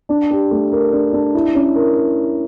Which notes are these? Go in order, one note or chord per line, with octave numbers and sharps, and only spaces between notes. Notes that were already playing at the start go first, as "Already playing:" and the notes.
D4
G4
A3
A#4
D4
D4
E4
C#4
A#4